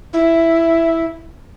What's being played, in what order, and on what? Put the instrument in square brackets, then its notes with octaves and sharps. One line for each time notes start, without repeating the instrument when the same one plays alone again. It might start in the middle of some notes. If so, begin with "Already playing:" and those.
[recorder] E4